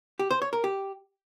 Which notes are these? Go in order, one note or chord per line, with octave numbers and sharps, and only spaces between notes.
G4
C5
C#5
A#4
G4